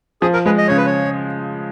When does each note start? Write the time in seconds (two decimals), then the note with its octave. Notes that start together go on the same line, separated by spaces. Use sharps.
0.22 F3 G#4
0.33 A#4
0.46 G#3 B4
0.58 D#5
0.68 C#3 C#5
0.77 B4
0.86 C#5